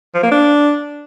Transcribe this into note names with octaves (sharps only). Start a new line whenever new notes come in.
F3
A#3
D4